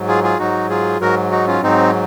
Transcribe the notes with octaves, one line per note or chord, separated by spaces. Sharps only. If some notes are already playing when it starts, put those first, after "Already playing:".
Already playing: G#2 F#3
F4 G#4
F4 G#4
G#2 F#3 D#4 F#4
F4 G#4
G#2 F#3 F#4 A#4
D#4 F#4
C#4 F4
G#2 F#3 C4 D#4